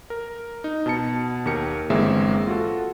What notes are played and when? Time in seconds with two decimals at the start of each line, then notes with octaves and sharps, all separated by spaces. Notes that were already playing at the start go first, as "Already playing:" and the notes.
0.10 A#4
0.64 D#4
0.86 B2 A5 C#7
1.46 D#2 G4 A#4 C#7
1.90 G1 E3 G#3 A#3 C4 E5
2.47 F4 F#4 A4